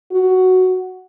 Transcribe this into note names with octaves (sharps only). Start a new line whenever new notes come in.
F#4